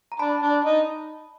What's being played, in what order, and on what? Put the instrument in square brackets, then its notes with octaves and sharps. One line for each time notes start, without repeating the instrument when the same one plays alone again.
[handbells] A#5
[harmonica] D4 [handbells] A5 B5
[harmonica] D4
D#4